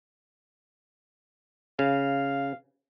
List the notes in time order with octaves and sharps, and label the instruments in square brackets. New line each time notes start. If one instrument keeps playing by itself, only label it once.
[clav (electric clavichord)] C#3 [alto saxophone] F5